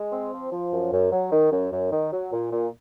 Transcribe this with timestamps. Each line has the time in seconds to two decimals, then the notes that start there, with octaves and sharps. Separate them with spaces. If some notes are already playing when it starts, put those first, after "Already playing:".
Already playing: G#3
0.13 C4
0.32 F3
0.52 F3
0.72 F#2
0.92 F#2
1.12 F#3
1.32 D#3
1.52 F#2
1.72 F#2
1.92 D#3
2.12 F#3
2.32 A#2
2.52 A#2